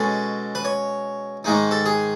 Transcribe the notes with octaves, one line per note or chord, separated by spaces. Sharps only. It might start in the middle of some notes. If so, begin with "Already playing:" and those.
Already playing: B2 G#3 C#4 A4
B4
C#5
G#2 D#3 G#3 D#4
A4
G#4